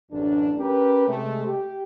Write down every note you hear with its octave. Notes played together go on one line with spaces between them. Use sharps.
A1 F#2 D4
C#4 G4 A#4 B4
C3 G#3 A3
G4